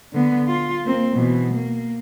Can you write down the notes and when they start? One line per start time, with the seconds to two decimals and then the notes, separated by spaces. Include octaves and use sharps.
0.14 D3 B3
0.48 F4
0.85 A#3 C4
1.15 B2 E3
1.52 A#3